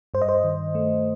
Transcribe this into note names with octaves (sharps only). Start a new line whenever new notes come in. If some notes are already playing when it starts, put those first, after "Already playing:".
G2 C5
D#5
C5
D#3
A3